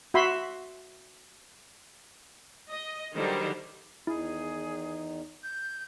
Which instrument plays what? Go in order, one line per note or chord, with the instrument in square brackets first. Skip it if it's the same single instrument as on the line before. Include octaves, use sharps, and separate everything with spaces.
[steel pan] F#4 E5 B5 C6
[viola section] D#5
D3 D#3 F#3 G3 C5
[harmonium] E2 D#3 D#4 [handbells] E4 [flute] G#4
[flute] G6